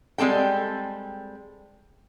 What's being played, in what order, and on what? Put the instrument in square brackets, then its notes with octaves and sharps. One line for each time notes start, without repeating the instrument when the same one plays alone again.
[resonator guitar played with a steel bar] G3 G#3 C4 A4 G5